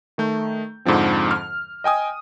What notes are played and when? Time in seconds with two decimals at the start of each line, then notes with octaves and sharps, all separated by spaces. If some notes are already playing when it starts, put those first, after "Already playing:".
0.18 D#3 A3 G6
0.85 F2 G#2 D3 F3 C4
1.31 F6
1.84 D#5 G5 G#5 D#6